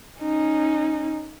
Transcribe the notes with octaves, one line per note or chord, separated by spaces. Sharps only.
C#4 D#4